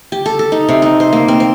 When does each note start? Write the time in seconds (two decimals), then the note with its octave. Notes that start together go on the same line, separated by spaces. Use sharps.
0.12 G4
0.26 A4
0.39 A4
0.52 D#4
0.69 C3
0.82 D#4
1.00 C5
1.13 A#3
1.28 C4
1.40 C4